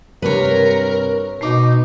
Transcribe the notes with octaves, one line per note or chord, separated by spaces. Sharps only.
G2 C3 A#4 B4 C#5
B2 D#4 D#5 D6 C7